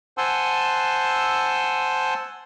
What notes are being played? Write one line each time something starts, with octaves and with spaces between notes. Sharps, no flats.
C5 F#5 G#5 A5 C6 E6